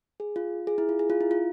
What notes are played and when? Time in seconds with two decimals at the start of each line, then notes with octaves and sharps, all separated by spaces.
0.20 G#4
0.36 F4
0.67 G#4
0.78 E4
0.89 F4
0.99 G#4
1.10 F4
1.21 E4
1.31 F4